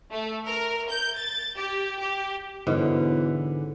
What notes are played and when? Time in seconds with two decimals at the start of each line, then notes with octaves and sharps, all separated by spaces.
0.12 A3
0.48 A#4
0.89 G6
1.19 A6
1.56 G4
2.00 G4
2.67 G#2 B2 D3 E3 C#4